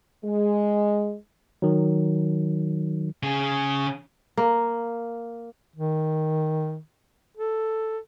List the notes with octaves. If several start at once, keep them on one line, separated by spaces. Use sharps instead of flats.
G#3
D#3 F#3
C#3 G#4
A#3
D#3
A4